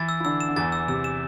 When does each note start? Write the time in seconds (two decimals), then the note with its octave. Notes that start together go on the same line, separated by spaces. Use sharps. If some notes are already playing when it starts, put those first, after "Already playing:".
Already playing: E3 E4 A6
0.09 E6
0.20 E4
0.25 D3 D4 E6
0.40 E7
0.49 D3
0.56 E2 E3 A6
0.72 E6
0.88 C3 E6
1.04 E7